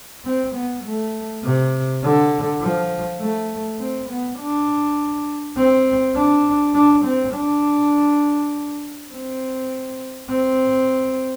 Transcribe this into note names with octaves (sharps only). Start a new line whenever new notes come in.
C4
B3
A3
C3
D3
F3
A3
C4
B3
D4
C4
D4
D4
C4
D4
C4
C4